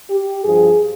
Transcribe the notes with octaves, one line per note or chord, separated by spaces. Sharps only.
G4
G2 F3 G#4